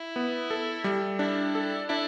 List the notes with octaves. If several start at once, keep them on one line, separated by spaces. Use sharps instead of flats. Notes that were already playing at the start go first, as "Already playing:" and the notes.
Already playing: E4
B3
A4
G3
D4 E4
A4
D4 E4